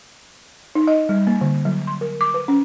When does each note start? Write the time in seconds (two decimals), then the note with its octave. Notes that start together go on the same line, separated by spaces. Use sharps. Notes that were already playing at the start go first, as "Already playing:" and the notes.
0.75 D#4
0.87 D#5
1.09 G3
1.27 A#3
1.41 D3
1.65 F#3
1.87 C6
2.01 A#4
2.21 D6
2.34 B4
2.48 C#4